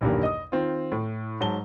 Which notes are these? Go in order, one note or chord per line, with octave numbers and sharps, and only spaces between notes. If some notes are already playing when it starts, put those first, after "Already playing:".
B1 E2 G2 D#3 G3 A#3
D#5 D#6
D#3 C4 F4
A2
G#2 F#3 A5 G7